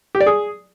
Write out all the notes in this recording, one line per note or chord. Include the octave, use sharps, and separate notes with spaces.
G4
D5
G#4